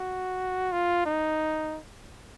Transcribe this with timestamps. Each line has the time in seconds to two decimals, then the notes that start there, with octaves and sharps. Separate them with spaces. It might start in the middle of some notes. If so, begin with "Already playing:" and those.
Already playing: F#4
0.72 F4
1.06 D#4